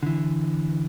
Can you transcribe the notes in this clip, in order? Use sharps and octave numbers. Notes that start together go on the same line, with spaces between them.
D3 E3